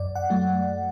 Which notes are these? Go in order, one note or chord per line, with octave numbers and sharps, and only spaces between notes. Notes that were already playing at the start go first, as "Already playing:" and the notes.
Already playing: F#2 D5
F#5
F#3 A3